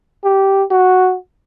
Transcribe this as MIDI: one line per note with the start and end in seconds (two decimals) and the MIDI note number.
0.24 0.63 67
0.71 1.15 66